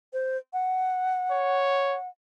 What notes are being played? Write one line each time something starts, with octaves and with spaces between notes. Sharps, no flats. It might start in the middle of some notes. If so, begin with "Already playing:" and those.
C5
F#5
C#5